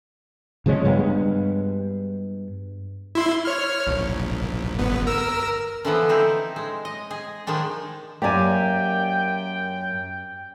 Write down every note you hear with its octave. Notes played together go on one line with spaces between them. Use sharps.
C#3 F3 G#3 C#4
G2 G#3 B3
E4 C6
C#5 F6
A#1
G1 B3
A#4 E6
D3 E3 F3 B3
C4 D#4 E4
G#3
D#5
G#4
D#3 F3 G#3 D4
F#2 A#3 G4 D5 G5 G#5